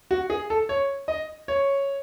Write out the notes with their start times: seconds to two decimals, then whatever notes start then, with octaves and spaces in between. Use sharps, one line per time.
0.11 F#4
0.30 G#4
0.50 A4
0.69 C#5
1.08 D#5
1.48 C#5